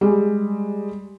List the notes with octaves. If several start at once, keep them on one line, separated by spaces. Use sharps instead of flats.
G3 G#3